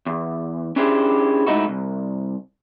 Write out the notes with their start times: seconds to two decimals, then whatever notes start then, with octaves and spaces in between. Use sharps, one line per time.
0.06 E2
0.76 C#4 D4 E4 G4 G#4 C5
1.46 G#2 B2 A3 D#4 E4 F#4
1.68 C2